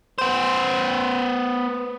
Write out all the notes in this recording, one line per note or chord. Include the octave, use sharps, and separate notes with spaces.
B3 C5